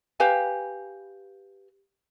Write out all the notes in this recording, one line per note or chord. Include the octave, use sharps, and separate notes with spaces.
G4 B4 F5 G#5